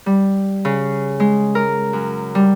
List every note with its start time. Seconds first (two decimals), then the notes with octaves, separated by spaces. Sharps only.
0.06 G3
0.65 C#3
1.20 G#3
1.55 A#4
1.93 F#2
2.35 G3